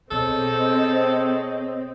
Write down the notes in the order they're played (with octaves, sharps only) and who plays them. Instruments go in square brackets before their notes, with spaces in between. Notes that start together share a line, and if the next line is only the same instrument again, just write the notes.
[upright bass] B2 [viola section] C4 [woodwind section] G#4 C#5 D#5 [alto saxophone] A4